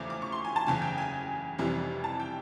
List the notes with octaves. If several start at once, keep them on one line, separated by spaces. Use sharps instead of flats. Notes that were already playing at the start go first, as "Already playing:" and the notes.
Already playing: E2 C#3 F3 A3 C#4 D6
D6
C#6
C6
G#5
A5
F#1 E2 C#3 G#5
G5
G#5
F1 F2 C3 E3 G3
A5
G5